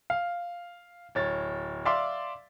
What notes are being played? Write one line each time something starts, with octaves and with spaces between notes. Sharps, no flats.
F5
D1 C#5 A6
D5 E5 F5 C6 D6